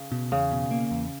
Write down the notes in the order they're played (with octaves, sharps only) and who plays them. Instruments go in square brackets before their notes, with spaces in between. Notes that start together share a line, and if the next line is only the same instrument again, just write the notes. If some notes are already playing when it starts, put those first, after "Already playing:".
Already playing: [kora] C#3
[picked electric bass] B2
[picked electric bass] E2 [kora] C#3
[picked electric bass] B2
A#3
E2